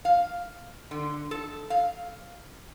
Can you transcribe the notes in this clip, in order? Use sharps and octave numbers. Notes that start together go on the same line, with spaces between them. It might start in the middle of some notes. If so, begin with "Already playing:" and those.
F5
D3
A4
F5